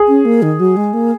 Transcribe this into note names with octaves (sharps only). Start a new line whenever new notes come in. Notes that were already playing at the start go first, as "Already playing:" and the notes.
Already playing: G#4
C#4
A#3
D#3
F#3
G#3
A#3